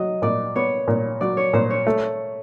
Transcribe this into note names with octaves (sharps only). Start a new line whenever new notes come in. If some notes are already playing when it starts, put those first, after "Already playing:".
Already playing: F#3 D#5
A#2 D5
B3 C#5
A#2
F#3 D5
C#5
A#2 C5
C#5
A3